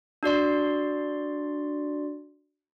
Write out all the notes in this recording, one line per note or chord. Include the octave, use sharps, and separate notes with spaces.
D4 F#4 D5 C6